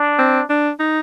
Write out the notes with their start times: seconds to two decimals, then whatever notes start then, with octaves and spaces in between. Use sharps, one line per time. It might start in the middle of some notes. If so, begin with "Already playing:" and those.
Already playing: D4
0.19 C4
0.50 D4
0.80 D#4